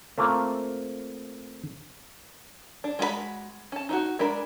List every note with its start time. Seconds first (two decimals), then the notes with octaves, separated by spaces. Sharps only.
0.18 A3 A#3 C4 F4
2.84 D4
2.99 G#3 F#4 G#4 B5
3.72 C#4 A5
3.89 D#4 E4 F#4
4.19 G#3 D4 A#4 B5